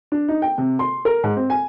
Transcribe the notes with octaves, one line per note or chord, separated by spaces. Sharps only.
D4
D#4
G5
C3
C6
A#4
G#2
C4
G#5